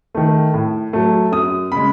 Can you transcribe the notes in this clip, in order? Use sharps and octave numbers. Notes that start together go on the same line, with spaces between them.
D#3 A3
A2
F#3 A3
F#2 D#6
C#3 G#3 B5